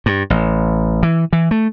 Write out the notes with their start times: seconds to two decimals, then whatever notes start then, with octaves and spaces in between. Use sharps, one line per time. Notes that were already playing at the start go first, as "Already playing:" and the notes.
0.06 G2
0.30 A1
1.03 E3
1.33 E3
1.51 A3